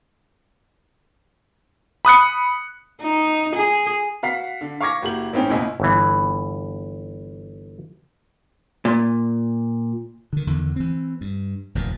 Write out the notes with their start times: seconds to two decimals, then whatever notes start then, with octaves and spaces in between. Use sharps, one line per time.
2.05 B5 D#6 F#6 C#7
3.02 D#4
3.56 G#4
4.23 F#4 F5 F#5 B6 C7
4.61 D3
4.81 F5 C#6 D6 G#6 A#6
5.02 F#1 F#4 G4 F#7
5.33 A1 G#2 C4 C#4 G5
5.49 F#1 C#2 B2 E4 D#5 G#5
5.80 G1 E3
8.85 A#2
10.33 D3 D#3
10.47 E2 D3 D#3
10.76 E3 C4
11.21 G2
11.75 F1 D#2 A#2